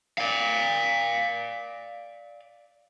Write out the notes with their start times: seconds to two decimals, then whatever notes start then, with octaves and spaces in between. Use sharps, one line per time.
0.18 D5 F5